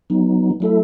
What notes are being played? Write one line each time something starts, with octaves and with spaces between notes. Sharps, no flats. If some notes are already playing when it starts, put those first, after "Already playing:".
F#3 B3 D#4
F#3 A3 E4 A4 E5